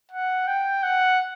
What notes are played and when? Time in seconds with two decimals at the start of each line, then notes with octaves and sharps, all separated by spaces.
0.11 F#5
0.47 G5
0.83 F#5